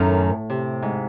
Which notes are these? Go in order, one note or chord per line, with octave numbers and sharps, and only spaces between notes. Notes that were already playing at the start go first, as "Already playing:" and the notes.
Already playing: F#2 A2 D#3 A3 C#4
C3
G#2